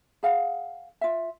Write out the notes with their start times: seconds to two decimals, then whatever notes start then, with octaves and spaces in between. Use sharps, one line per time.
0.23 G#4 F5 F#5
1.01 F4 E5